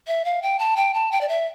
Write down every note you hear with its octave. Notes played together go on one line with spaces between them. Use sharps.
E5
F5
G5
A5
G5
A5
G5
D5
E5